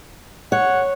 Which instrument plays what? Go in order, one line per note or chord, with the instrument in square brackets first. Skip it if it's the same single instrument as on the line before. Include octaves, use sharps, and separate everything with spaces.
[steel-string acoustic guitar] C#5 [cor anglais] F#5